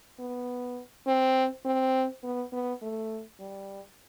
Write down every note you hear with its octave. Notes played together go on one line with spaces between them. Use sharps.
B3
C4
C4
B3
B3
A3
G3